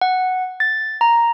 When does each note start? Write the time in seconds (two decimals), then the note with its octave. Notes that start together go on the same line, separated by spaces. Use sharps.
0.01 F#5
0.60 A6
1.01 A#5